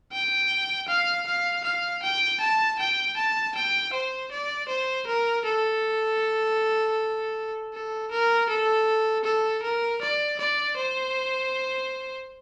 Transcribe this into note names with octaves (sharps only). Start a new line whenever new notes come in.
G5
F5
F5
F5
G5
A5
G5
A5
G5
C5
D5
C5
A#4
A4
A4
A#4
A4
A4
A#4
D5
D5
C5